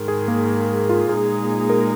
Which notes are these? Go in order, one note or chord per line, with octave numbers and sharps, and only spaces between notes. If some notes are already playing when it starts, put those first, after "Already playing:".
Already playing: G#2 D#3 G#3
G#4
A#3
F4
A#2 G#3 D#4 G#4
A#4